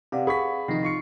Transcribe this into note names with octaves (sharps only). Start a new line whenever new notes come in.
C3 G4 B4 D5 F5 F#5
G#4 B5 C#6 B6
C3 D#3 F3 D#4 A#6 C7
F4 C#6 C7 C#7